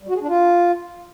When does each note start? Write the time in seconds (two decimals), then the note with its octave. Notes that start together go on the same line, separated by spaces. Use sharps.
0.03 G3
0.09 F#4
0.15 G#4
0.22 D4
0.28 F4